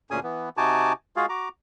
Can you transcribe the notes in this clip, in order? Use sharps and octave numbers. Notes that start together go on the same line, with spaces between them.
D2 A#2 C#4 G#4 G#5 D#6
E3 B3
C3 D#4 F#4 G#5 A5 D6
G#3 F4 F#4 G#4 F5
F#4 A#5 D6